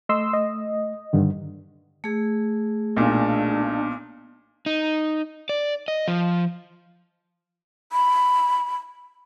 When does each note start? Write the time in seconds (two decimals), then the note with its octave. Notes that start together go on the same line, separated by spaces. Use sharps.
0.09 A3 D#5 C6 E6
0.33 D#5
1.13 G2 D3 D#3
2.04 A3 G#4
2.97 B1 A#2 D4
4.66 D#4
5.49 D5
5.88 D#5
6.08 F3
7.92 B5